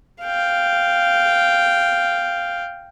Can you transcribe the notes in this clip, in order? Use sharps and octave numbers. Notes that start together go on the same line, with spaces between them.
F5 G5